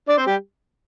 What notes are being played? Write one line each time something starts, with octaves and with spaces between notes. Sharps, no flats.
D4 D5
C4 C5
G3 G4